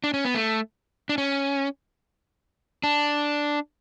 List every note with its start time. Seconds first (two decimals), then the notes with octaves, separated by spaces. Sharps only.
0.04 D4
0.14 C#4
0.25 B3
0.35 A3
1.09 D4
1.18 C#4
2.84 D4